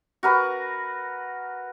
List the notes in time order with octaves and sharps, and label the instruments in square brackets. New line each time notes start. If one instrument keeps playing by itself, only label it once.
[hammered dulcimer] F#4 A#4 B4